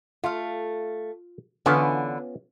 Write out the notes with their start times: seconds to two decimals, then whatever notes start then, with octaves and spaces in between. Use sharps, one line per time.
0.24 A3 F4 F5
1.66 D3 E3 B3 C#4 F4 B4